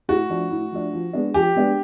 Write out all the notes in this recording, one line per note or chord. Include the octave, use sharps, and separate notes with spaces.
A2 F#4
F3 A3 D4
A2
F3 A3 D4
F3
G#3 B3 D4
F3 G4
G#3 B3 D4